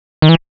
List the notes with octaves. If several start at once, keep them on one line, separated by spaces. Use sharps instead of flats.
D#3
E3